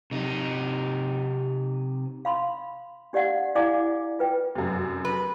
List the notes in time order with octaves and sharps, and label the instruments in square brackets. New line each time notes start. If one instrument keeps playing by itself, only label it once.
[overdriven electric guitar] C3 D#4
[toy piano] F5 B5 C6
D4 G4 D5 F5 F#5
E4 D5 F5 G#5 D6
F4 B4 G5
[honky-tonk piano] F1 F#2
[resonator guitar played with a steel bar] B4